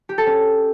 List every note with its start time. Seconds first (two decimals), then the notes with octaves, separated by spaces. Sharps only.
0.09 G4
0.18 A4
0.27 C#4